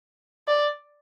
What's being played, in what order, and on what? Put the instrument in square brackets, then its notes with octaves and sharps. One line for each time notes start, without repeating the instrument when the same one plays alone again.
[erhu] D5